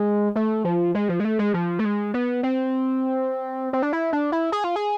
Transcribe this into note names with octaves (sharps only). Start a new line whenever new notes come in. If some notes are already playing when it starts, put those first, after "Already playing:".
Already playing: G#3
A3
F3
G#3
F3
G#3
A3
G#3
F3
A3
G#3
B3
C4
C4
D4
E4
D4
E4
G#4
F4
G#4